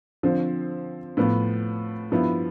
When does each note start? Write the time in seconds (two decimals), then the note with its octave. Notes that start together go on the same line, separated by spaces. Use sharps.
0.23 D3 F3 C4
1.17 A2 F3 B3
2.11 G2 F3 B3 E4